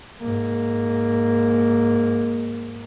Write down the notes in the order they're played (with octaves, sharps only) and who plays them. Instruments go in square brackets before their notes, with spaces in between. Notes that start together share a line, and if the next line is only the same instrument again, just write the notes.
[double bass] G#2 A#3